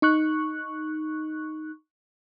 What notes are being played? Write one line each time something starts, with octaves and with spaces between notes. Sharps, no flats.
D#4 C#6 F#6